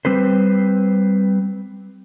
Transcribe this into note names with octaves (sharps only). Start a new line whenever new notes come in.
G3 C4 B4 C5